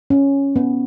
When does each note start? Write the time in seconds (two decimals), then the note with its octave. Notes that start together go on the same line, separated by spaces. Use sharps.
0.10 C#4
0.56 B3